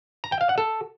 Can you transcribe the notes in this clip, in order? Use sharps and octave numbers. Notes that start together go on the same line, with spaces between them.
A#5
G5
F5
F#5
A4